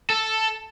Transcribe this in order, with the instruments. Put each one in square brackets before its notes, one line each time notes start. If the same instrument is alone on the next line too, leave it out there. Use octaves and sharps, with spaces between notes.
[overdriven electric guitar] A4